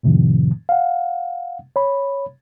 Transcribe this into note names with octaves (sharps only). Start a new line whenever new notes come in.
F2 A2 C3 D#3 F3
F5 F#5
C#5 B5